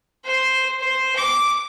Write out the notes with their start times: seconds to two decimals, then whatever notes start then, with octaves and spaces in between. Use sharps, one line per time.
0.25 C5
0.79 C5
1.16 D6